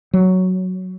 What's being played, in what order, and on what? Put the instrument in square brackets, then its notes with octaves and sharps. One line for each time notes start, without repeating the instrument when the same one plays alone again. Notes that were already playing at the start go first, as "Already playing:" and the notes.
[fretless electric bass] F#3